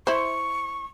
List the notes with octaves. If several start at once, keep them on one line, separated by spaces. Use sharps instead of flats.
E4 C5 C#6